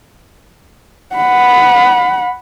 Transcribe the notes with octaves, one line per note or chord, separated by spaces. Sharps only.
F#5 B5